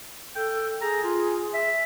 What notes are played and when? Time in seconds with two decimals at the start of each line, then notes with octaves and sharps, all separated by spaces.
0.36 A4 G5
0.82 G#4 A#5
1.04 F4
1.54 E5